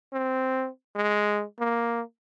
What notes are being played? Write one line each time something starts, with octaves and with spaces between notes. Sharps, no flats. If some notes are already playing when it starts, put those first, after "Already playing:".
C4
G#3
A#3